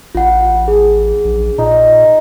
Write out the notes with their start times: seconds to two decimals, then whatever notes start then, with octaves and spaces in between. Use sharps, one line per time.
0.15 A1 F4 F#5
0.68 G#4
1.25 A#1
1.58 A#2 D#4